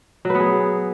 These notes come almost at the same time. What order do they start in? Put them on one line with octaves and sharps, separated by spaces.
F#3 B4 B3 G#4